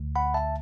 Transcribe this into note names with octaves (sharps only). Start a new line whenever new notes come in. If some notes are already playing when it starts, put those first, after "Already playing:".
Already playing: D2 D3 A3
F#5 B5
E5 A5